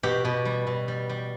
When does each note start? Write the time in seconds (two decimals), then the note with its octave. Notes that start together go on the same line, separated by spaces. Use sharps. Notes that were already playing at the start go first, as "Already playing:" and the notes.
0.03 B2 G4
0.25 B2
0.45 G3
0.67 B2
0.88 G3
1.09 G3